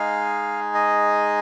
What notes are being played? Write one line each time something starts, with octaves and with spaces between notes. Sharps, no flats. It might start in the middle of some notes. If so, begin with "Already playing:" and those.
Already playing: G#3 D#4 G#4 F5
D#5